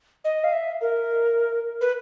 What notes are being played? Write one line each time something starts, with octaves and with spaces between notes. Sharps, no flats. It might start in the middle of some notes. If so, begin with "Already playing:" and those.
D#5
F5
E5
A#4
B4